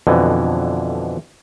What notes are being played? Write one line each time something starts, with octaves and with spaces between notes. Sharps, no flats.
F2 B2 D3 E3